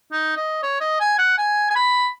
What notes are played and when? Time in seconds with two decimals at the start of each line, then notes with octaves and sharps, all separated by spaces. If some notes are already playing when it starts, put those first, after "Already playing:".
0.12 D#4
0.37 D#5
0.63 C#5
0.81 D#5
1.01 G#5
1.19 F#5
1.38 G#5
1.70 G#5
1.76 B5